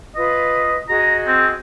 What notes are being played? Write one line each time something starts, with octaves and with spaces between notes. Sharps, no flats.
F4 B4 D#5
F#4 G#4 D#5 A#5
C4